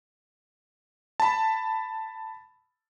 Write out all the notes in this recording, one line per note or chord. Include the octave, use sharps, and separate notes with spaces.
A5 B5